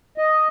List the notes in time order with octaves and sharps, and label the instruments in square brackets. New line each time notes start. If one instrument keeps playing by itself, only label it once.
[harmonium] D#5